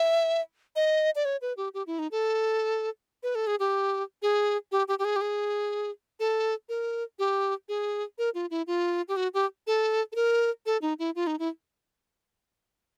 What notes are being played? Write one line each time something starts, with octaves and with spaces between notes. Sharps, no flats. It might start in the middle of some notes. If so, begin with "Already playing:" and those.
Already playing: E5
D#5
D5
C#5
B4
G4
G4
E4
D#4
A4
B4
A4
G#4
G4
G#4
G4
G4
G4
G#4
G4
G#4
A4
A#4
G4
G#4
A#4
F4
E4
F4
G4
F#4
G4
A4
A4
A#4
A4
D#4
E4
F4
D#4
E4